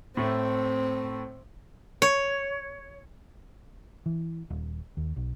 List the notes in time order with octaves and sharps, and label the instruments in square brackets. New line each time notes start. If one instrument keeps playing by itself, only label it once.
[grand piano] A2 A3 [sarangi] C4
[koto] C#5
[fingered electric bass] E3
D#1
D#2
B1